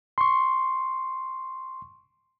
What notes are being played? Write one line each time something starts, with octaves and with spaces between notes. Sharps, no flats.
C6 C#6